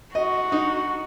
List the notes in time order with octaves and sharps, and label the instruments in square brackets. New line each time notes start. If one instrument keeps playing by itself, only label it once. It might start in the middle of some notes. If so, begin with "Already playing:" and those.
[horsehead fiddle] F#4 [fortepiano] D#5
[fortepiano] D#4